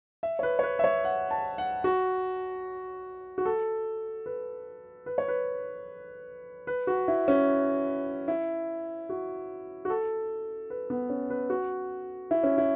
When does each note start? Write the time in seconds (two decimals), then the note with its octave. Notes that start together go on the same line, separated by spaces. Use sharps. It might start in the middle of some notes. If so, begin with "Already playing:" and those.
0.23 E5
0.39 C#5
0.43 B4
0.59 C#5
0.63 B4
0.79 E5
0.84 C#5
1.05 F#5
1.31 A5
1.58 F#5
1.84 F#4
3.38 F#4
3.45 A4
4.26 B4
5.06 B4
5.18 C#5
5.28 B4
6.67 B4
6.87 F#4
7.08 E4
7.28 C#4
8.28 E4
9.09 F#4
9.85 F#4
9.90 A4
10.70 B4
10.90 B3
11.10 C#4
11.30 B4
11.50 F#4
12.31 E4
12.43 C#4
12.58 E4